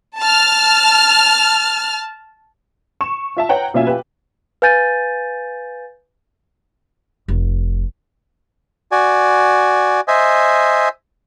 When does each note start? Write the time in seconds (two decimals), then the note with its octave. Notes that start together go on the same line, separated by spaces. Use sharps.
0.19 A5 F6
3.01 C#6 E7
3.37 F4 E5 A5
3.49 B4 C#5 F#5 G5 A#5
3.74 B2 A#3 C#4 F4 E5 G#5
3.87 F4 G4 B4
4.62 B4 F5 G#5 G6 A6 D#7
7.28 F1
8.92 F#4 D5 G#5
10.08 C5 D#5 E5 G#5